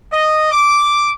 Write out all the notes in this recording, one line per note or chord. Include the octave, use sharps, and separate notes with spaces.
D#5
D6